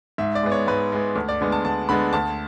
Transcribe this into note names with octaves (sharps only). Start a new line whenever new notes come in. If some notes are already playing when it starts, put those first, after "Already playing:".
G#2 E5
D5
G#3 B3
C#5
G#2 B4
G#3 B3
D2
D5
D3 G#3 B3
A5
D2 A5
D3 G#3 B3 B5
D2 A5